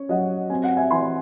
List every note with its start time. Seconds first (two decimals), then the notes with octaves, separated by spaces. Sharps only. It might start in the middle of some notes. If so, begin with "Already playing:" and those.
Already playing: C#4 C#5
0.09 F#3 D#5 F#5
0.50 C4 G#5
0.63 F#5
0.77 E5 G#5
0.91 E3 G#5 C6